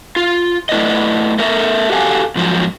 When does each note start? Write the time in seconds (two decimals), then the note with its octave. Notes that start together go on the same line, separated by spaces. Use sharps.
0.16 F4
0.69 A3 E4 B4 D5 D#5
1.39 A3 A#4 E5
1.90 F#4 G4 A4 E5 F5 G#5
2.35 G#2 F3 F#3